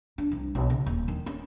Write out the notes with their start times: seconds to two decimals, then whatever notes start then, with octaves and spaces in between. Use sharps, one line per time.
0.18 D4
0.32 C2
0.55 B1
0.70 C#3
0.86 D#1
1.08 D#3
1.26 C#4